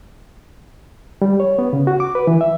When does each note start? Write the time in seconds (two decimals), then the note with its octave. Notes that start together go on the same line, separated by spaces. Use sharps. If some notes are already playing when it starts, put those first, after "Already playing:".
1.22 G3
1.40 C#5
1.59 B3
1.73 C#3
1.87 F#4
2.00 D6
2.15 B4
2.27 E3
2.41 E5